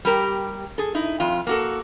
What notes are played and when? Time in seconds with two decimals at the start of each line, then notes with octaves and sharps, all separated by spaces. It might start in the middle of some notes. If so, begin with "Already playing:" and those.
0.05 G3 G4 A#4
0.78 G#4 A4
0.95 D#4 E4
1.20 F2 F4
1.47 A#3 F#4 A4